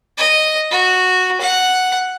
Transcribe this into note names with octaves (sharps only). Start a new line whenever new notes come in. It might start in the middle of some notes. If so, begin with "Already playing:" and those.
D#5
F#4
F#5